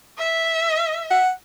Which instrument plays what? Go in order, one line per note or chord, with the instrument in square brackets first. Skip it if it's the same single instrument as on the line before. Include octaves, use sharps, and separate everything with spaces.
[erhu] E5
[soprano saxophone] F#5